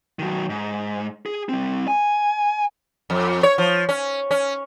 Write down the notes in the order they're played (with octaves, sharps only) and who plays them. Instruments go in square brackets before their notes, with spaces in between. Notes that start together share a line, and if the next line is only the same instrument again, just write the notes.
[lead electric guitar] D#3 F#3
G#2
G#4
G3 C4
G#5
[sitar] F2
C#5
F3
C#4
C#4